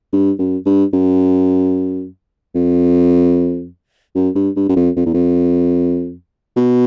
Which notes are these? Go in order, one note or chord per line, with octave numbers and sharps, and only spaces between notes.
G2
F#2
G2
F#2
F2
F#2
G2
G2
F#2
F2
F2
E2
F2
B2